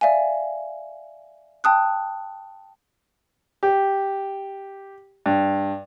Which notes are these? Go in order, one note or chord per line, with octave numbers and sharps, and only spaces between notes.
D5 E5 F5 G#5
G5 A5 D#6 F#6
G4
G2